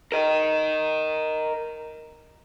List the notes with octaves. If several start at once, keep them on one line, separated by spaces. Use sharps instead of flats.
A#4 D#5